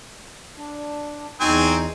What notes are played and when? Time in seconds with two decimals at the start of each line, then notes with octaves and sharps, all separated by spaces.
0.57 D4
1.41 E2 F#3 C4 D#4 G#5